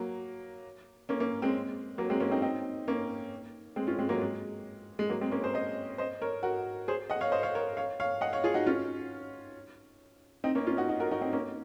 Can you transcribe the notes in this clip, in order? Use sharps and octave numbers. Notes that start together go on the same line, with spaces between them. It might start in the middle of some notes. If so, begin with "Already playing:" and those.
Already playing: F#3 A#3
A#3 C#4
A#3 C#4
G#3 C4
F#3 A#3
G#3 C4
A#3 C#4
C4 D#4
C4 D#4
A#3 C#4
G#3 C4
C#4 F4
G#3 C4
F#3 A#3
G#3
G#3
F#3 A#3
G#3 C4
A#3 C#4
G#4 C5
C5 D#5
C5 D#5
A#4 C#5
F#4 A#4
G#4 C5
D#5 F#5
C#5 F5
C5 D#5
C#5 F5
A#4 C#5
C#5 F5
C#5 F5
D#5 F#5
C#5 F5
F4 G#4
D#4 F#4
C#4 F4
C4 D#4
A#3 C#4
C#4 F4
D#4 F#4
D#4 F#4
F#4 A#4
D#4 F#4
C4 D#4
A#3 C#4